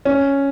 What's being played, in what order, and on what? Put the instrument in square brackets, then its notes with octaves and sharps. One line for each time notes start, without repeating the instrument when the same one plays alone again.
[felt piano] C#4